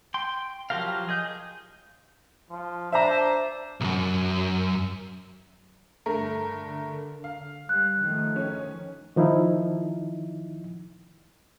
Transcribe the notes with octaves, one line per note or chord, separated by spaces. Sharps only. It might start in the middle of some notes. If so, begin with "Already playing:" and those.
G5 C6
F3 F#3 G4 A#4 F5
G#4 D#5 G6
F3
D4 C5 E5 A#5
B1 F#2
G2 D3 A3 A#4
F5
G3 F#6
D#3 F3 A3
C#4
D#3 F3 D#4 E4